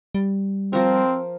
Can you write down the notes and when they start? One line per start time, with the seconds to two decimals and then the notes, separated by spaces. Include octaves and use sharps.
0.15 G3
0.73 F3 C4 A#4